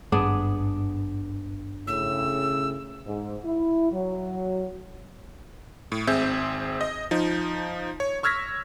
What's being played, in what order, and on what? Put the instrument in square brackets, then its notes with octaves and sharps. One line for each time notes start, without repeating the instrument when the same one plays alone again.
[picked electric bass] G#1 G2 [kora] B3 D4 G#4
[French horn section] A2 C#3 [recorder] E6
[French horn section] G#2
E4
F#3
[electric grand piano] A2
G#1 C4 G#4 E5 G6 G#6
D#5
F3 D#4
C#5
C#6 E6 F6 G#6 A#6 B6